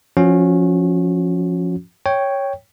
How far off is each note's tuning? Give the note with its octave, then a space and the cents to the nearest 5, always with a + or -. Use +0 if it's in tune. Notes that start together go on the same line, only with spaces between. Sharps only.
F3 +0 C#4 +0 F#4 -30
C#5 +0 G5 +0